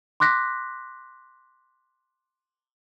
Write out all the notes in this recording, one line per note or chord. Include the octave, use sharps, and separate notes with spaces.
C6 D6 F#6 A#6 B6